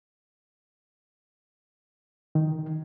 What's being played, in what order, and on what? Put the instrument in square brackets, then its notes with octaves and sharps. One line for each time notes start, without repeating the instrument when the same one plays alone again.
[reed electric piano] D#3